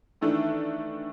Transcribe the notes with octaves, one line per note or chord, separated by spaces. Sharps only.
D#3 E3 A3 D4